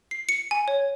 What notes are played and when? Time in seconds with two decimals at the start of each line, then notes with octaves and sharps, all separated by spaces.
0.11 C7
0.29 C#7
0.51 G#5
0.68 C#5